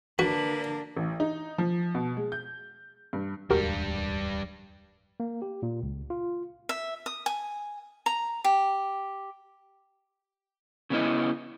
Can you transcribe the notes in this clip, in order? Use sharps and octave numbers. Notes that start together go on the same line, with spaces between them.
D3 A#3 D4 F#4 B4
A1
D#4
F3
B2
G#3
G6
G2
D1 E2 G2 G3 G#3 F#4 G4 A#4
A#3
G4
A#2
C#2
F4
E5
D#6
G#5
A#5
G4
C#3 G3 B3 C#4 E4 D#5